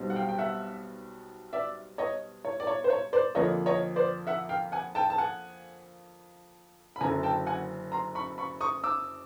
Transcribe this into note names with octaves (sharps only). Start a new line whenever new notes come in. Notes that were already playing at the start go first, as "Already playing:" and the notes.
Already playing: B1 B2 G3 C4 D#4
F#5
F5 G5
G5
E5 F#5
D5 E5
C#5 D#5
C#5
D5
C#5
C5
C#5
C5 D5
F2 D3 F3 A#3 C#5 D#5
C#5 D#5
C5 D5
E5 F#5
F5 G5
F#5 G#5
G5 A5
A5
F#5 G#5
B5
F#1 F#2 D3 G#5 A#5
G5 A5
F#5 G#5
A#5 C6
B5 C#6
B5 C#6
C#6 D#6
D6 E6